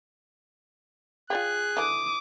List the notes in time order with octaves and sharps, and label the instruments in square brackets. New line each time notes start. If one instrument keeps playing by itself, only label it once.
[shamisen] F4 D5 G5 [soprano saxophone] G#4 [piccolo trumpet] F#6
[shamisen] D3 E3 [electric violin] D6 D#6